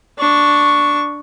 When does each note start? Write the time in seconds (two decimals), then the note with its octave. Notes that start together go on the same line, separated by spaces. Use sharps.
0.18 D4 C#6